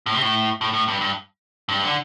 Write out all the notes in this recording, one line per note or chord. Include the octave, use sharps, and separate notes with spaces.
A2
C3
A2
A2
A2
G2
G2
G2
D3